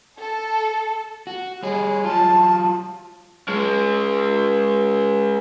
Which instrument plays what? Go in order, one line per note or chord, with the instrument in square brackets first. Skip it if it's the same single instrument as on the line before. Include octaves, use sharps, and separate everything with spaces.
[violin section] A4
[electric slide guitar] F#4
[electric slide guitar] G3 G#4 [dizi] C#5
[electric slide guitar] F#3 F4 [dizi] A5
[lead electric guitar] G#3 C#4